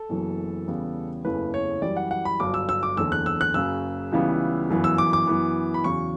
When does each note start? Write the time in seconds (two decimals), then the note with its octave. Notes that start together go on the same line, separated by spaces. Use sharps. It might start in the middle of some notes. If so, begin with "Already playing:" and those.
Already playing: A4
0.09 F#1 F#2 E3 B3
0.68 E2 C#3 G3 B3
1.25 F#1 E2 C#3 E3 A3 B4
1.54 C#5
1.82 F#2 E3 G3 D5
1.97 F#5
2.11 F#5
2.25 B5
2.40 G1 G2 F#3 D6
2.54 E6
2.69 E6
2.83 D6
2.97 F#1 E2 D3 E6
3.12 F#6
3.26 E6
3.41 F#6
3.54 F#1 F#2 C#3 E6
4.12 C#2 C#3 E3 G3 B3
4.70 G1 F#2 E3 B3
4.84 E6
4.98 D6
5.13 D6
5.27 F#2 E3 B3
5.74 B5
5.84 E2 C#3 F#3 C#6